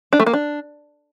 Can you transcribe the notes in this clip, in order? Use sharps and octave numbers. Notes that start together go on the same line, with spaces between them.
D4
A3
A#3
D4